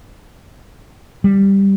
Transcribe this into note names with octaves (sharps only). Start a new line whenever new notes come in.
G3